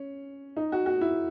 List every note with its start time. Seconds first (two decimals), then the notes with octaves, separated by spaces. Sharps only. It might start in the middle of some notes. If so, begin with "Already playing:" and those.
Already playing: C#4
0.57 D#4
0.72 F#4
0.86 F#4
1.01 E4